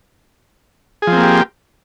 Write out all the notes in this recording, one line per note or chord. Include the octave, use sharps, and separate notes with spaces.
F3 A#3 C4 G4 G#4